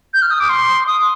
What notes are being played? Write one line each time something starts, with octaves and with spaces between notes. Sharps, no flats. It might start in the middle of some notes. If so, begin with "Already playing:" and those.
G6
F6
D#6
D6
C6
D#6